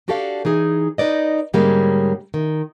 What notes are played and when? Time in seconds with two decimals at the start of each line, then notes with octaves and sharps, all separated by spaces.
0.08 D4 F#4 G4 A4 D5 F5
0.45 E3 D#4 G#4
0.98 D#4 B4 D5 D#5
1.53 G#2 D3 G3 G#3 A#3 C#4
2.34 D#3